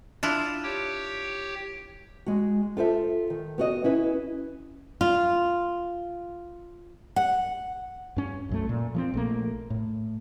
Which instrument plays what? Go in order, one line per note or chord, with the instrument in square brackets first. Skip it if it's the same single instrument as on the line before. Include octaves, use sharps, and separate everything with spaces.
[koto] D4 E4 F4
[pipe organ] G4 C#5 G5
[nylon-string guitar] G#3 F#4
F4 A4 C5 E5
D#3
B3 F#4 D#5
C#4 E4 B4
F4
F#5
[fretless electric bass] G2 C#4
B1 F#2 A3
A#2
F3 G#3 C4
A#1 A3 A#3
A2